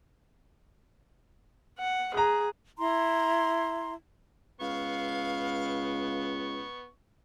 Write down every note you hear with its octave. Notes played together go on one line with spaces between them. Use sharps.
F#5
G#4 A#5 F#6
E4 A#5 C6
C#2 B3 F5 C#6